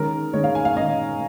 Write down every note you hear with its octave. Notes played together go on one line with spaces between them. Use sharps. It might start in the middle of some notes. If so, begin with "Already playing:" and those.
Already playing: D#3 G#3 C#4 A#4
D#3 G#3 C#4 C#5
F5
G#5
F5
D#3 G#3 C#4 D#5